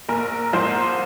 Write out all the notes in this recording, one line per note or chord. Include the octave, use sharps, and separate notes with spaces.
A#1 A#4
G#2 F3 C5